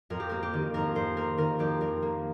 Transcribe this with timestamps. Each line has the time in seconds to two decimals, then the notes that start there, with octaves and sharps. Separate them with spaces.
0.10 F2 A#4
0.20 G4
0.29 A#3 A#4
0.43 G4
0.54 D#3
0.74 F2 A#4
0.95 F2 C5
1.17 A#3 A#4
1.38 D#3 A#4
1.59 F2 G4
1.81 F2 A#4
2.02 A#3